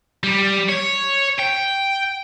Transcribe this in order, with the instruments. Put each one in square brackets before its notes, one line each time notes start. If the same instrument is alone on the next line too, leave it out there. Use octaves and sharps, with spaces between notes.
[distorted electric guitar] G3
C#5
G5